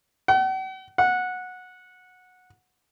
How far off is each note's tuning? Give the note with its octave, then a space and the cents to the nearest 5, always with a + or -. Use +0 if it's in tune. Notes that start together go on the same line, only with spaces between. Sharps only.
F#5 +45
F#5 -15